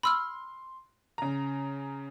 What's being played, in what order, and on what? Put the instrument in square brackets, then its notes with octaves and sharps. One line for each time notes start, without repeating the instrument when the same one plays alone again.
[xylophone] B5 E6 F6 [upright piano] C6
[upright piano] C#3 A#5